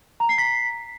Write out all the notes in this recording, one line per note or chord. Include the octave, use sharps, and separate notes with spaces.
A#5
C7
B6